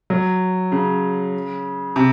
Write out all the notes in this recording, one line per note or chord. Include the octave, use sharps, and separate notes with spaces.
F#3
C#3
C3